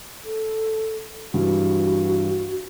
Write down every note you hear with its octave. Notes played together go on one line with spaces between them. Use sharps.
A4
G2 E3 F#4